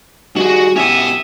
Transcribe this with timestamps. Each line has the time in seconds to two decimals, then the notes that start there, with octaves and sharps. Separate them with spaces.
0.37 D#3 G3 F#4 G#4
0.76 B2 C#4 E4 G4 E5 F#5 D#6